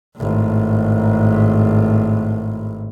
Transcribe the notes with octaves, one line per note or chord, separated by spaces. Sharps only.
G#1 A2